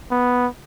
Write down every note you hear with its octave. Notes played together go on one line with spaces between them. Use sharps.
B3